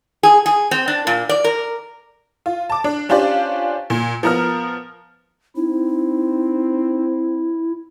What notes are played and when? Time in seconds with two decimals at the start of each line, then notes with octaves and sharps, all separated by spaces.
0.23 G#4
0.46 G#4
0.71 C4
0.88 D4
1.07 A#2
1.29 D5
1.44 A#4
2.46 F4
2.70 A5 D6
2.84 D4
3.09 C#4 D4 F4 G4 C5 D5
3.90 A#2
4.23 F3 B3 A#4 A#5 F6
5.56 C4 D#4 E4